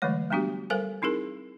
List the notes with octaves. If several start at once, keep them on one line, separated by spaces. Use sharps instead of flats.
D3 E3 F#3 G#3 A3 C#5
G3 G#3 B3 D4 F#4 G4
G3 A4 A#4 C5 F5 G#5
C4 D#4 E4 G#4 A#4